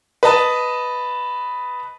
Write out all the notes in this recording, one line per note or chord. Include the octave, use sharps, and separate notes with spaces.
B4 D#5 A5